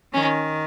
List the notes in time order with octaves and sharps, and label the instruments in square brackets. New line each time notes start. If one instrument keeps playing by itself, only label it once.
[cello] D#3 [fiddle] C#4